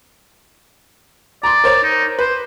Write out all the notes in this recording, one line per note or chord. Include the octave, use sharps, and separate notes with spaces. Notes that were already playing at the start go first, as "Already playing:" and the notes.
D5 A#5 C6
A#4 C5 C#5
D#4
B4 C5